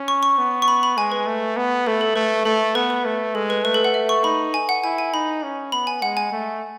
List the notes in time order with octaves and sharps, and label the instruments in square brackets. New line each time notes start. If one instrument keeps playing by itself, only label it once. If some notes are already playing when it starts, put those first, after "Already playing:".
Already playing: [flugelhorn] C#4
[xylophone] C#6
C#6
[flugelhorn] B3
[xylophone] C#6
B5
B5
[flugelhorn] G#3 [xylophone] G#5
[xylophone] B4
[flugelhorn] A3
B3
[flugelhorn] A3 [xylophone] A4
[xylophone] A4
[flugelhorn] A3 [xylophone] B4
[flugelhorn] A3 [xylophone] A4
[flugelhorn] B3 [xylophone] B4
[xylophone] B4
[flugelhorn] A3
[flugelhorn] G#3 [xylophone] A4
[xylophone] B4
[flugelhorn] A3 [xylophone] B4
[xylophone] A4
F#5
E5
C#6
[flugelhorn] D#4 [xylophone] B5
[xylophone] G#5
F#5
[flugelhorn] E4 [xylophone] G#5
[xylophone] G#5
[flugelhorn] D#4 [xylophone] B5
[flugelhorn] C#4
[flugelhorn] B3 [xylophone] B5
[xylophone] G#5
[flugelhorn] G#3 [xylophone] F#5
[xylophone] G#5
[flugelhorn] A3